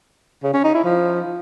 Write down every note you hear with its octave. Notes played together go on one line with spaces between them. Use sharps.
C#3
C#4
D#4
E4
F3